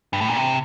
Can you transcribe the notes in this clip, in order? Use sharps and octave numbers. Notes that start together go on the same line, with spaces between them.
G2
A2
A#2
C3